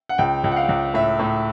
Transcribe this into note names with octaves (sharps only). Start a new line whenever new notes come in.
F#5
C#2 G5
C#2
F#5
F5
C#2
A2 E5
A2